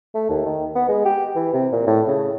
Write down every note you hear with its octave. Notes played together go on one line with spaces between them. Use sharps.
A3
D#2
D#3
B3
G#3
G4
E3
C3
A#2
A2
C#3